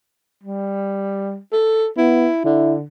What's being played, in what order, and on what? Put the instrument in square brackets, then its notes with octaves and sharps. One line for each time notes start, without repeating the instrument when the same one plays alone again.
[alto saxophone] G3
A4
[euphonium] B3 [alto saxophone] E4
[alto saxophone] D3 [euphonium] E4